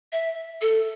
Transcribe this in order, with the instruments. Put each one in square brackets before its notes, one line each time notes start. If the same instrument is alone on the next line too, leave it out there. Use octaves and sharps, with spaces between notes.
[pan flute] E5
A4